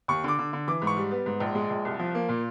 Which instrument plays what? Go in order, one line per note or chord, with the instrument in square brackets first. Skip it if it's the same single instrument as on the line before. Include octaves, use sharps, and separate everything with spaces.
[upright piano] D#2 C#6
D3 D6
D3
D3
E3 D6
G#2
C#6
G3
B3
G#2
A#1
G#3
A#1
C2
F3
A#3
A#2